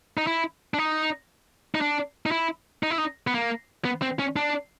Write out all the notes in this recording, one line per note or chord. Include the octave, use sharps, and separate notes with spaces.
D#4
E4
D4
D#4
D#4
D4
D#4
E4
D#4
E4
D#4
B3
A#3
B3
C4
C#4
D4